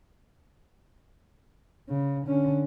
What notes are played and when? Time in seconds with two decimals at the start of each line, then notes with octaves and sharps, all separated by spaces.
1.89 C#3
2.27 D3 C#4